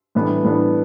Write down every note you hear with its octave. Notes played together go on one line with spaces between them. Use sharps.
A2 E3 G3 B3 D4
A2 E3 G3 B3 D4